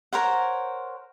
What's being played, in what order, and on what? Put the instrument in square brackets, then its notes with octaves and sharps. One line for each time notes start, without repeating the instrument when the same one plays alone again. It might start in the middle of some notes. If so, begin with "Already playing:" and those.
[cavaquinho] A#4 C5 C#5 F#5